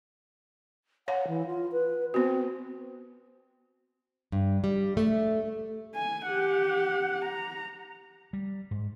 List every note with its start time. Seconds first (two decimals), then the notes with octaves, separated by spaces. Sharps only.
1.08 C#5 F5 F#5
1.28 E3
1.47 F4
1.72 B4
2.14 B3 C4 F#4
4.32 G2
4.64 G3
4.97 A3
5.95 G#5
6.26 G4 F#5
7.25 A#5
8.33 G3
8.71 G#2